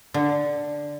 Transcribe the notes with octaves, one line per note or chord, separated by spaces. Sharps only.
D3